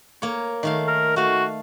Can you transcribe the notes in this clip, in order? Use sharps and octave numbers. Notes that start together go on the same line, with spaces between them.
A#3 C#5
D#3 A3 F5
A#4
A3 F#4 F5